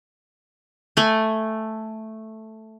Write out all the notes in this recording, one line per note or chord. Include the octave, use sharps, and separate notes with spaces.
A3 G#5